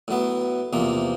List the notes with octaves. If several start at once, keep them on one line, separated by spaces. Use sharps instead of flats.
A2 F#3 B3
E2 C3 F3 A#3